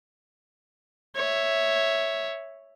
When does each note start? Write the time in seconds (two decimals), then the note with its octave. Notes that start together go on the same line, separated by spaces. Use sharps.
1.16 C#5 E5